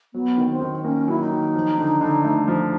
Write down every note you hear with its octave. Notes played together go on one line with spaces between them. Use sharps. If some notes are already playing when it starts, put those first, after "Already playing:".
F#3 B3
D#3
C4
D#3
A#3 C#4
F#3 E4
D#4
D#3
F3
D3
D3
A3
F3